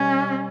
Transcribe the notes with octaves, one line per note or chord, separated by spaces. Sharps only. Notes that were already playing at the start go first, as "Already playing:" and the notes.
Already playing: B2 G3 C#4